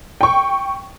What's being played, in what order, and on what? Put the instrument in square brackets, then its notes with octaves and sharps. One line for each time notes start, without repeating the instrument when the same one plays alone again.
[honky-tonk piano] G5 C#6